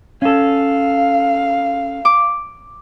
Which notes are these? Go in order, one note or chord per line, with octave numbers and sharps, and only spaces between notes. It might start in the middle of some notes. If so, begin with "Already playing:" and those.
C#4 A4 F5
D6